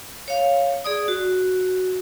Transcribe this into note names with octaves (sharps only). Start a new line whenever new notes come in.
C#5 F5
G#4 D5 D#6
F#4